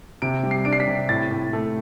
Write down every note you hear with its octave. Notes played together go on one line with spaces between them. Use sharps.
C3 D7
G3
C7
D4 D7
C7
B6
C3
A2 A6
A2
A3